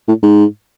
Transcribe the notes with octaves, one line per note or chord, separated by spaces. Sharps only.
A2
G#2